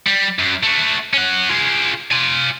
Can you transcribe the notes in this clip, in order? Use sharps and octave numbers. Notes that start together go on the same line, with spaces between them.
G3
F#2
A3 F#4
C#4 F#5
F4 G#4
F4 G#5